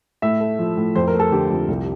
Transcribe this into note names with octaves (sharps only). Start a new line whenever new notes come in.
A2 E5
A3
F3
A2
F2 C5
A#4
A3
A4
D3 G4
F2
C2